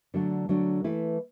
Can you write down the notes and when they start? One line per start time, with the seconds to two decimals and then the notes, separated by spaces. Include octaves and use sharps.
0.14 D3 F#3 A3 D4
0.49 D3 F#3 A3 D4
0.84 E3 A3 E4 B4